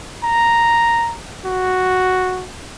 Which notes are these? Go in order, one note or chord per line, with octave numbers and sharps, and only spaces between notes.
A#5
F#4